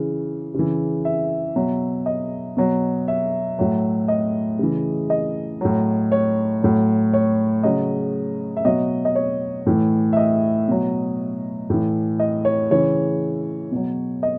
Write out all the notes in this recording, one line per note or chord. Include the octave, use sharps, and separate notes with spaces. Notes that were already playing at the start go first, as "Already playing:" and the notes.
Already playing: C#3 E3
C#3 E3
E5
B2 F#3
D#5
B2 F#3
E5
A2 F#3
D#5
C#3 E3
D#5
A2 F#3
C#5
A2 F#3
C#5
C#3 F#3 D#5
E5
B2 F#3 D#5
D#5
C#5
A2 E3
E5
D#5
B2 F#3
A2 E3
D#5
C#5
C#3 E3 C#5
B2 F#3
D#5